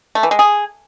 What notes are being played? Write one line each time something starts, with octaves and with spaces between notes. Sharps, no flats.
A3
E3
G#3
G#4